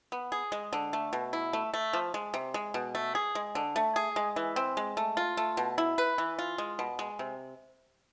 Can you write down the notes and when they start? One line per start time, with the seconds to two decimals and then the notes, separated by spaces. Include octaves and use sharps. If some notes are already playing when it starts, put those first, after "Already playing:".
0.12 B3
0.32 G#4
0.52 G#3
0.73 D3
0.93 A3
1.13 B2
1.33 E4
1.53 A3
1.74 A3
1.93 F3
2.14 G#3
2.34 C3
2.54 G#3
2.74 B2
2.95 A3
3.15 G#4
3.35 G#3
3.55 D3
3.76 A3
3.96 G#4
4.16 G#3
4.36 E3
4.56 C4
4.77 G#3
4.97 A3
5.17 F4
5.37 A3
5.57 B2
5.78 E4
5.98 B4
6.18 E3
6.39 F4
6.58 G#3
6.79 B2
6.99 G#3
7.19 C3